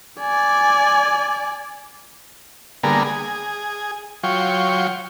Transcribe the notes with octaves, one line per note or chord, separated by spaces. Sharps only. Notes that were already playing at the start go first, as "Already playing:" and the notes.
D5 G#5
D3 G3 A#3 B3 G#4 A#4
G#4
F#3 F4 C#5 G5